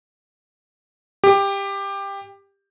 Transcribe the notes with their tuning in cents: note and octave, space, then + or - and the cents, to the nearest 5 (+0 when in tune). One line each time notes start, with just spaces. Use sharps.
G4 +15